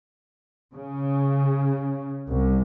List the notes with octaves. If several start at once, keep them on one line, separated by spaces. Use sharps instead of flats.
C#3
C2